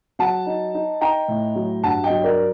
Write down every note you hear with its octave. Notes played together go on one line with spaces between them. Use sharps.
F#3 F#5 A5
D#4
D#4
D#4 G5 A#5
A2
F#3
G2 F#5 A5
D#5 G5
F#3
A#4 D5